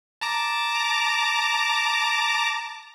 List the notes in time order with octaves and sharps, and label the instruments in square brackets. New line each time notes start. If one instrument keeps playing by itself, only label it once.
[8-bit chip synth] A5 A#5 D6